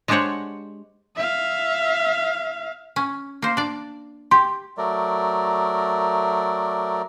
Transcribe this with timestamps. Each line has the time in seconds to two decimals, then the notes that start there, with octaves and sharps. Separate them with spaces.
0.08 G#3 D4 G4 C5 C#5 F#5
1.16 E5 F5
2.96 C#4
3.42 A#3 C5
3.57 D4 D5
4.31 G4 C6
4.78 F#3 A3 A#4 D5